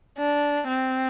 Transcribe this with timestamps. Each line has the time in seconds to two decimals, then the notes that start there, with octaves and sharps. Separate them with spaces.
0.18 D4
0.68 C4